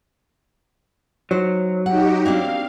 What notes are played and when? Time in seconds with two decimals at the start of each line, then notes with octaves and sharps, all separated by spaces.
1.31 F#3 D#4 C5
1.86 D#4 F#4 G4 F#5
2.26 A#3 C4 D4 F5